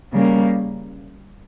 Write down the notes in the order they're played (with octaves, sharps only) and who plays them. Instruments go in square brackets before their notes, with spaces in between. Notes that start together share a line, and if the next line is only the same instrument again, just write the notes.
[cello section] C#3 G3 A#3